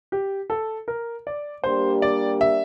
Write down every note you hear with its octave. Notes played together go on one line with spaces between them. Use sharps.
G4
A4
A#4
D5
G3 A#3 D4 G4 C5
D5
E5